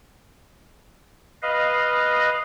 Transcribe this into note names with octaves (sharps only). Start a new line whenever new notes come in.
B4 D#5 F5